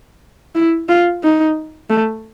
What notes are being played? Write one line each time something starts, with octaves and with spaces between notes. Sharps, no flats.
E4
F4
D#4
A3